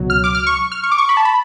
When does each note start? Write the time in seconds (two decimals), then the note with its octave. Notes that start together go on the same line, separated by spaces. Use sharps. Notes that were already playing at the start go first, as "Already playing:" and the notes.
Already playing: C#2 B2 F#3
0.10 F6
0.24 D6
0.35 F6
0.47 C#6
0.72 F6
0.83 C#6
0.92 D6
0.98 C#6
1.09 B5
1.17 A5
1.25 B5